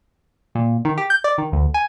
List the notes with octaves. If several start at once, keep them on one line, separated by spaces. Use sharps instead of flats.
A#2
D#3
G4
G6
D5
D#3
D2
G#5